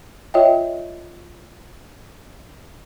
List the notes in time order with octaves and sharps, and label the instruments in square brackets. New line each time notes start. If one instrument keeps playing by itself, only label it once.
[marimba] F4 C#5 D#5 E5 G5